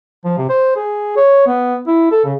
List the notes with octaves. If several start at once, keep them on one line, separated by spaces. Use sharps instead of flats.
F3
C3
C5
G#4
C#5
B3
E4
A4
C#3